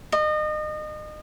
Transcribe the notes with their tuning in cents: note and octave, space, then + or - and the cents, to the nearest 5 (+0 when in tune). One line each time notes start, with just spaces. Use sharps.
D#5 -30